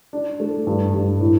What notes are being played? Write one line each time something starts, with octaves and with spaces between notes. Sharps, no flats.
D4
A3
G2
G2
A2